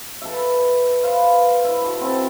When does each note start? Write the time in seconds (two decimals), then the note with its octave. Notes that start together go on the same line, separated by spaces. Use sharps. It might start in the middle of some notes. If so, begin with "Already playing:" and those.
0.22 A4 B4 E5
1.03 B4 C5 F5
1.64 E4
1.82 F#4 A4 D6
2.01 C4 A4